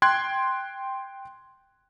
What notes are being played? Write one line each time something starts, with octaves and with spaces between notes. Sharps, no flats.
G5 C6 F#6 G#6